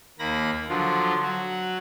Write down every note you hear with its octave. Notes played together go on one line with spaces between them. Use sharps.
D#2 A#3 B5 A#6
D3 F3 F#3 F4
F#3 F#4